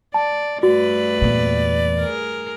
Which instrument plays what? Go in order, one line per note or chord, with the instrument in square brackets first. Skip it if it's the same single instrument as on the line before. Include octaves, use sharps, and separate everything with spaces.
[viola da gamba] D5 [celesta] A5
[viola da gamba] G2 A3 B4 [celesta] F#4 [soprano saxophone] D5
[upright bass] E2 A#2
[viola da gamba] G#4 A#4